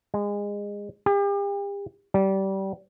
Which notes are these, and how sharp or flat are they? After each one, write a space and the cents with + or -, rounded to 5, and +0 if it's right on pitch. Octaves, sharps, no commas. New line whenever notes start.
G#3 -25
G4 +40
G3 -25